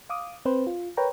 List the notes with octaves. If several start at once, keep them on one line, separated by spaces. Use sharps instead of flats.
F5 D6 D#6
C4 B4 C5
F4
A#4 B4 C#5 G5 A#5